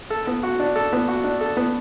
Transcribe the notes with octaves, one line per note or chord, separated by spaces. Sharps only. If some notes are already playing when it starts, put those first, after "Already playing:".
A4
B3
F#4
D4
A4
B3
F#4
D4
A4
B3